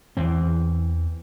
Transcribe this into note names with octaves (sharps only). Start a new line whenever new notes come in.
E2 E3 C4